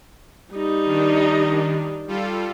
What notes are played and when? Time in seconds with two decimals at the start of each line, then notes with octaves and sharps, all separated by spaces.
0.52 G3 D#4
0.85 D#3 D4
2.08 G3 F4 A4